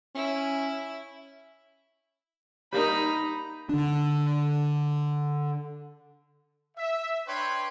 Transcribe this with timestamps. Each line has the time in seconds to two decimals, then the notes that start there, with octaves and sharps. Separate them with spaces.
0.15 C#4 E4
2.73 G3 A#3 D#4 B5
3.69 D3 D4
6.77 E5
7.27 D4 B4 C#5 G5 C6